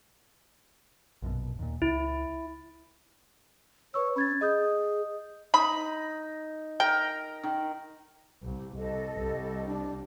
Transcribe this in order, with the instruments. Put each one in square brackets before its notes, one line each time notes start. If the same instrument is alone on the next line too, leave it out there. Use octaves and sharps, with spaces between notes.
[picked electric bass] A#1 F#2 B2
D#2 A#2
[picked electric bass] C#2 [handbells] E4
[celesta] B4 C#6 E6 [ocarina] C#5
[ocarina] C#4 [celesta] B5 G#6 A6
[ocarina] G#4 [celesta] D#5 D#6 G6
[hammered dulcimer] D#4 [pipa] B5
[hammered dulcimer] A#4 [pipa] G5
[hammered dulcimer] D#3
[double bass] C2
[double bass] C2 [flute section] A4 D#5
[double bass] C2 G3
[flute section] D4